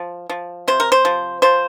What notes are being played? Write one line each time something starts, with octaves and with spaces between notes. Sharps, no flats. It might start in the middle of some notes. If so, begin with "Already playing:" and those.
Already playing: F3
F3
C3 C5
A#4
C5
F3
F3 C5